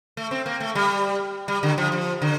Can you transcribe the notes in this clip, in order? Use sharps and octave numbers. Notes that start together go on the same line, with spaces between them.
A3
C4
A#3
A3
G3
G3
D3
F3
F3
D3